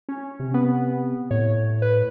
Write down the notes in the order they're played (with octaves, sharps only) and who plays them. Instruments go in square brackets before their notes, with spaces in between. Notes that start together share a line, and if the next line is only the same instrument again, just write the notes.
[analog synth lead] C#4
[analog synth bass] C3
[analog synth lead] B3
[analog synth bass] A2 [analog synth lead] C#5
[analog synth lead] B4